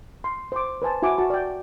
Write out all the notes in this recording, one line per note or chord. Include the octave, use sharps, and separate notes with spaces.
C6
C5 D6
B4 C5 G#5 A5
E4 F#4 F#5 G#5 D6
F#4 A5 C#6
D5 G5